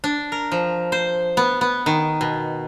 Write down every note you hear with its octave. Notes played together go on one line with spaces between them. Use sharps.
D4
A#4
F3
C5
B3
B3
D#3
B2